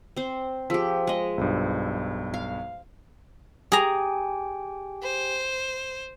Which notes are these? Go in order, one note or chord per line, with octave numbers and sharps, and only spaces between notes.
C4 C5
F3 G4 G#4 E6 B6
G#3 D#5
B1 G2
F5
G4 G#4 G5 G#5 A#5
C5